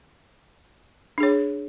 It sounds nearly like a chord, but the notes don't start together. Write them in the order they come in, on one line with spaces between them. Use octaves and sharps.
D4 G#4 C#5